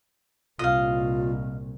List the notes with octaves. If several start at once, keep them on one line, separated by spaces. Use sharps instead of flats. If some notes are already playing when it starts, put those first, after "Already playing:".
C2 A#2 F4 D#5 F5